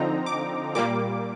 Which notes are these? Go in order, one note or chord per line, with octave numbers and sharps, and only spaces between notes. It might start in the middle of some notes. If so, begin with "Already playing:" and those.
Already playing: D3 F3 C4 D#4 A#5
D6
A#2 G3 A#3 D6